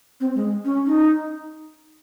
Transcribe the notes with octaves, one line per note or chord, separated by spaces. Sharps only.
C4
G#3
C#4
D#4